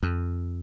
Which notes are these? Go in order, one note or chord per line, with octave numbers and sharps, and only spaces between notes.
F2